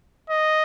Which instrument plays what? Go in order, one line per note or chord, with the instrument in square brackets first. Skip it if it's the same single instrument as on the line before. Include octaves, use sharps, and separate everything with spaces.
[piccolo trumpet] D#5